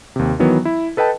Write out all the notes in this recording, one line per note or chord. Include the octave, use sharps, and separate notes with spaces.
D#2 C3
D#3 E3 F#3 B3
E4
A4 B4 D#5 G5 A5